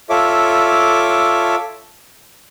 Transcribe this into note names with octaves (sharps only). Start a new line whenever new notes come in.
F4 A4 C#5 E5 D6